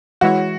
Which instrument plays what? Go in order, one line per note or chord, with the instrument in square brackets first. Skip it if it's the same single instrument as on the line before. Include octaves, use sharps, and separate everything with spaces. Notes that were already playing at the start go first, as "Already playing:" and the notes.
[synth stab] E3 G#3 E4 C#5 [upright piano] F#4